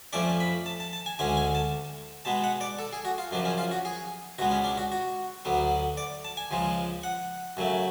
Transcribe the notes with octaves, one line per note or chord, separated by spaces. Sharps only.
F2 F3 A3 C#4 D5
B5
A5
A5
A5
G#5
D2 D3 G#3 C#4 G#5
G#5
A5
B2 G#3 B3 A5
F#5
D5
A4
G#4
F#4
F4
F#2 C#3 F3 D4
C#4
F4
F#4
G#4
C#2 B2 G#3 B3 F#4
C#4
D4
F#4
F#4
D2 D3 F#3 B3
D5
A5
G#5
C#2 C#3 F3 G#3
F#5
F#2 C#3 F#3 A3